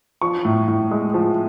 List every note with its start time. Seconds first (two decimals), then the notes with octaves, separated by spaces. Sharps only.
0.22 F3 C#6
0.45 A2
0.68 A2
0.91 G#3
1.14 F3